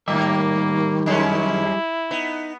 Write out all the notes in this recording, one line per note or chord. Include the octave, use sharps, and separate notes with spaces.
G#2 D#3 G3 A#3 G4 E5
F2 G#3 C#4 E4
B3 D#4